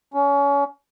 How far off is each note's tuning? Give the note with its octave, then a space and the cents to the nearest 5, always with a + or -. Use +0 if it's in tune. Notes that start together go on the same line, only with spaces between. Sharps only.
C#4 +30